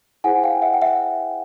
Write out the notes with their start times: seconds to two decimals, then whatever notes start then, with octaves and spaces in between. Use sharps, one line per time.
0.24 E4 G#4 C5 F#5 G#5
0.44 F5 G5
0.62 E5 F#5
0.74 G5
0.82 E5 F#5